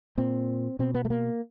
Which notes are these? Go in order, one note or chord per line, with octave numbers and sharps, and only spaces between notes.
A#2 C4
B2 C4
B3
A3
A#3